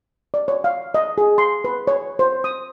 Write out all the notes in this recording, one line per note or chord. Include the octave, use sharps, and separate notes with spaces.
D5
C#5
F5
D#5
G#4
C6
B4
C#5
C5
D#6